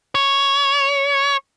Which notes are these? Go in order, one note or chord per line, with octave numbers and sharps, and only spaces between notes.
C#5